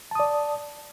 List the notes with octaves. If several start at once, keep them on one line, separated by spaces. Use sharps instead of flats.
D5 A5 D#6